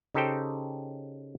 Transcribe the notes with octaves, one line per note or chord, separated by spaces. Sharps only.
C#3 D#4 G4 A4 C5 G5